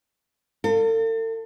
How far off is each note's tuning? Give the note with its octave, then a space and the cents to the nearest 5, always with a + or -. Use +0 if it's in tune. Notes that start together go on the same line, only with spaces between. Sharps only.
F4 +0 A4 +40